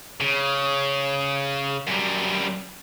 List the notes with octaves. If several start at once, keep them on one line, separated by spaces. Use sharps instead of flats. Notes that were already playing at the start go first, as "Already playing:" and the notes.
C#3
F#2 G3